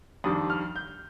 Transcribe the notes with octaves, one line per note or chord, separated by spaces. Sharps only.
F2 D#3 G3 D4 D#6
F6
G6